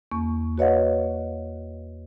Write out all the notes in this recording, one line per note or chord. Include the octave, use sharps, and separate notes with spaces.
E2 A#3 C#6
F#4 B4 C#5 D#5 F5 F#5